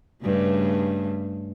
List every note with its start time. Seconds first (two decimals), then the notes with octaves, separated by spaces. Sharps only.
0.22 G2 C#3 A3